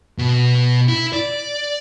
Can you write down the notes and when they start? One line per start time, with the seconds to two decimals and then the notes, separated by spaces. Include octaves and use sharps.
0.18 B2
0.88 E4
1.13 D5